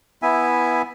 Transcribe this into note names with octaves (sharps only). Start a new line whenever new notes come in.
B3 E4 E5 G#5